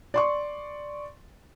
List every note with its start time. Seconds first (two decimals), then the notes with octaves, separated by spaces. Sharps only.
0.14 D5 C6 C#6